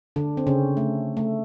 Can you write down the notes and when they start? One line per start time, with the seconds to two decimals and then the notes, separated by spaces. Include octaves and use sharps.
0.16 D3 D4
0.37 C4
0.47 C#3 C#4
0.77 A3
1.17 A3